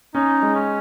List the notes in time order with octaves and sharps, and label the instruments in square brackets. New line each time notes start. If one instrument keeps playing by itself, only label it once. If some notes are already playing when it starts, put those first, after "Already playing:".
[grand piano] C#4 [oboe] D#4
[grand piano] G#3
[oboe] C#4